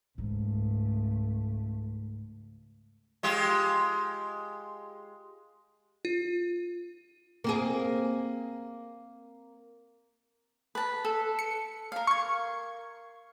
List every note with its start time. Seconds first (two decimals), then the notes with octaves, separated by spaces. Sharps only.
0.18 C#2 G#2 A3
3.23 G#3 F4 G4
6.05 F4
7.44 A#3 C4 G#4
10.75 B4 A5
11.05 A4
11.39 C#7
11.92 A#4 F5
12.07 C#6 G#6